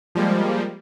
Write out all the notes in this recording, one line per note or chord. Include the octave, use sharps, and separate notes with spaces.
F3 G3 G#3 A#3